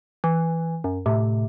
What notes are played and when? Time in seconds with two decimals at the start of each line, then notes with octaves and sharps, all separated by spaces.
0.24 E3
0.84 F#2
1.06 A2 C3